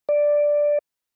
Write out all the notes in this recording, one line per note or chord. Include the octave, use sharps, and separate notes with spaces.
D5